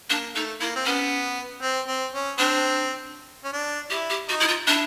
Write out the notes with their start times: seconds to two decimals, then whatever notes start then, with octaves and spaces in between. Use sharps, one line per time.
0.10 A#3 D4
0.35 A3 D#4
0.61 A#3 E4
0.75 C4
0.85 B3 C#4
1.62 C4
1.87 C4
2.13 C#4
2.38 C4 D4
3.44 C#4
3.53 D4
3.90 E4 G4
4.10 G4
4.29 D#4 F#4
4.40 E4
4.48 F4
4.67 D4 E4